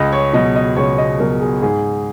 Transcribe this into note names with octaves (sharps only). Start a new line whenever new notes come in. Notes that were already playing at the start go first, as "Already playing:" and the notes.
Already playing: C#2 D#5
C#5
B2 F#3 D#5
D#5
C#2 C#5
D#5
B2 F#3 A#4
G#4
G#2 G#4